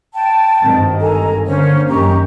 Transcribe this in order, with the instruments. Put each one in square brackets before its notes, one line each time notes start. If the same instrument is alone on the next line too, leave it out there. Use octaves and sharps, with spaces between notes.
[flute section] G5 A5
[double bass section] G#1 G2 D#3 [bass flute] C4
[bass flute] A4 [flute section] G#5 A#5
[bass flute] D3 [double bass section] A#3 [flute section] C#4 C5
[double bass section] F#2 D#3 [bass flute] C#4 [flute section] G4 A#5 C#6